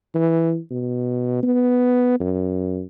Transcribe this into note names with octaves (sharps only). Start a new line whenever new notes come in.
E3
B2
B3
F#2